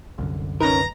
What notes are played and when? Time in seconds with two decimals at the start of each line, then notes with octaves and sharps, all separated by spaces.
0.18 C2 F#2 D3
0.60 C#4 D#4 A#4 B4 A#5